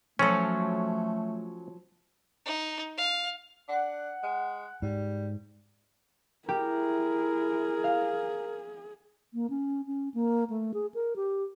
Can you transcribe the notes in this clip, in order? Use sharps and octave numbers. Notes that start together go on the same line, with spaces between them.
F3 F#3 A3 C#4 A4
D#4
F5
D4 F#5
G#3
G#2 G3
E4 G4 G#4 A#4
F5
A#3
C#4
C#4
A#3
A3
G#4
A#4
G4